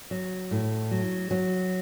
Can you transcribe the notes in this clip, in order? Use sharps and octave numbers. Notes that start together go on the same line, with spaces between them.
F#3
A2
F#3
F#3